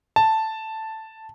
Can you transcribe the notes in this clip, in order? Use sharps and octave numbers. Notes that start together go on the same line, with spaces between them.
A5